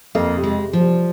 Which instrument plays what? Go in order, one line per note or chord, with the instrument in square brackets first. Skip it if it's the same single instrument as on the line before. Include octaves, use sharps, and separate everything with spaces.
[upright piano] F2 [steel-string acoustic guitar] A#3
[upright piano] C3
[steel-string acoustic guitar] G#3
[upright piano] C3
[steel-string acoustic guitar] F3
[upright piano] G3